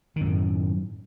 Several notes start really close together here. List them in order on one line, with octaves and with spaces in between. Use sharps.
D#3 F#2 A2